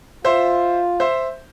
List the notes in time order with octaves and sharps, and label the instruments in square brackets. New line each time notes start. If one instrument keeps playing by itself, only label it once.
[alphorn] F4 [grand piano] C5 E5
[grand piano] C5 E5